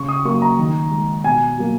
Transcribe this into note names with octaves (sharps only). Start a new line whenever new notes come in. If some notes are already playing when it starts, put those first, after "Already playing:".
Already playing: C#3 C#6
D#6
F#3 A#3 C#6
A#5
D#3
G#3
B2 G#5
F#3 A#3